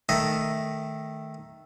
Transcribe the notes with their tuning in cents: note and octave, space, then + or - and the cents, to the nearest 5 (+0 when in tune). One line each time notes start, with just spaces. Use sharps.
D#3 +0 A3 +0 D#5 +0